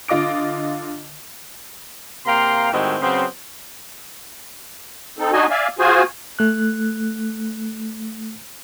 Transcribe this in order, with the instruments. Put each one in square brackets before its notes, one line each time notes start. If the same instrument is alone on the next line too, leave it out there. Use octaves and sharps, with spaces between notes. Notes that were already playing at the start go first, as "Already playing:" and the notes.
[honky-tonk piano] D3 F4 D#5 D6 D7
[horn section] C3 A#3 F5 G5 A#5 C6
A2 D#3 G#3 C4 F#4 G4
C#3 F#3 B3 C4
[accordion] C4 D#4 A4
D4 D#4 F#4 D#5 G#5
D5 E5 F5 G#5
F4 F#4 G#4 C5 G#5
[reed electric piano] A3 F#6